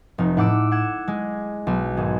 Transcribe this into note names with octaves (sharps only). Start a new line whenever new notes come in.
F1 D#4
A2 F#5 D6 E6 D7
F#5 G#6 E7
G#3
B1
G#1 G#4